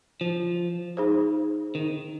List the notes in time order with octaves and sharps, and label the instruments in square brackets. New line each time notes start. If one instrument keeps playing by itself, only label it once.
[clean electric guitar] F3
[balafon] D#4 G#4 C5
[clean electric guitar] D#3